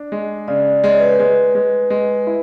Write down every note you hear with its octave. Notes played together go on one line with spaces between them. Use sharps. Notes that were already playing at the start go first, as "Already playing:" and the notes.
Already playing: D4
G#3
C#3 D5
G#3 D5
C#5
B4
C#5
G#3 B4
G#3
G#3
E4